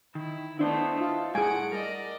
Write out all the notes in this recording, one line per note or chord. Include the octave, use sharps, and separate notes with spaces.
D#3 E4
A3 B3 D4 E4 C5 D#5
F4 A4
A2 G3 G#4 F#5 G#5 D7
A#4 D5 D#5